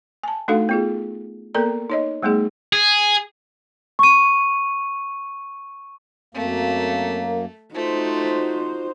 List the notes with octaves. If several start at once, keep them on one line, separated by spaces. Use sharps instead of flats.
G#5 A5
A3 D4 D#4 F#4 A4 F5
B3 F4 G#4
A#3 B3 A4 A#4 D5 A#5
D#4 C#5 D#5
G3 A3 B3 D#4 G#4
G#4
C#6 D#7
F#2 A3 A#3 C4
A3 D#4 F4 F#4 C5